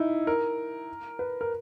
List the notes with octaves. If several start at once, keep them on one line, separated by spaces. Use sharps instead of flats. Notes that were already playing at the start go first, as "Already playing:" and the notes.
Already playing: D#4 E4
A#4
B4
A#4